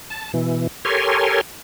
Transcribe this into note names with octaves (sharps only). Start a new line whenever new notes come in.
A5
B2 E3
G4 A4 A#4 C#5 G#5 C6